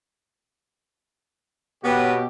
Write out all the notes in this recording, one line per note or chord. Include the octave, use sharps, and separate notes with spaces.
B2 B3 C#4 F#4 G4 B4